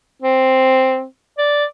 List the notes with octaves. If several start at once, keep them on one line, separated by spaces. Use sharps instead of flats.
C4
D5